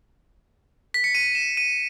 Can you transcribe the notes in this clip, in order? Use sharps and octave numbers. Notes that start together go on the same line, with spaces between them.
B6
C#7
D#7
E7
D#7